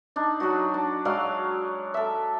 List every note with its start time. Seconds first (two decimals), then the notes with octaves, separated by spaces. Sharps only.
0.16 D4 D#4
0.40 F#3 D4 D#4 F#4
0.74 D4
1.05 F#3 G#3 D5 F5
1.94 A4 E5